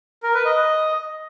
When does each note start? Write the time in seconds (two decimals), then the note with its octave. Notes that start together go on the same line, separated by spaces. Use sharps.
0.23 A#4
0.34 B4
0.45 D#5